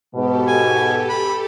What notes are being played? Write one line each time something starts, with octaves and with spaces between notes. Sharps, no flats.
G#2 B2 G4 A4
G#5
B5